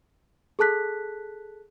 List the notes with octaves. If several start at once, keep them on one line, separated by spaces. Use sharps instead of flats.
G#4 A4 A5 F#6 B6